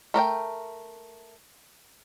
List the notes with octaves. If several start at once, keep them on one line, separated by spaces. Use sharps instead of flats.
A3 A#4 D5 G5